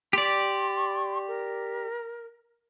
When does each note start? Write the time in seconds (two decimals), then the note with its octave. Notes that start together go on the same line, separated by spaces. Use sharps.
0.13 G4 D5 C6
1.28 A#4